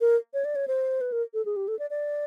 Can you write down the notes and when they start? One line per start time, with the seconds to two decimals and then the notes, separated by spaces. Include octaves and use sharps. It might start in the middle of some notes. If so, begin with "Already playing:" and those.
0.01 A#4
0.34 C#5
0.45 D5
0.56 C#5
0.68 C5
1.01 B4
1.12 A#4
1.34 A4
1.45 G#4
1.56 G4
1.68 A4
1.79 D5
1.90 D5